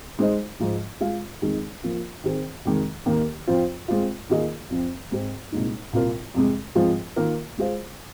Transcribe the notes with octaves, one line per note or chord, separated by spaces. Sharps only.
G#3 D#4 C5 D#5
G#2 F3 G#3
G#3 F4 G#4 F5
F2 D#3 G#3 D#4 G#4
F3 A#3 F4
D#3 C4 G#4
F2 C3 D#3 G#3
D#2 D#3 A#3
F2 F3 C4 F4
G#3 C4 F4
D#3 A#3 F4 G#4 D#5
F2 F3 C4
G#2 G#3 C4 G#4
C2 A#2 G#3 D#4
C2 A#2 A#3 F4 A#4
F2 C3 G#3
G#2 F3 C4 F4 G#4
D#3 A#3 F4 A#4 F5
G#3 F4 G#4 C5 F5